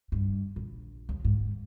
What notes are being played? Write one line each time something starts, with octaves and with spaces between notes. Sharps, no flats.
G2
A#1
D#2
G#2